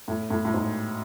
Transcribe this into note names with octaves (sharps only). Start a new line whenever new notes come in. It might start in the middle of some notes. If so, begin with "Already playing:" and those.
A2
A2
A2
G#2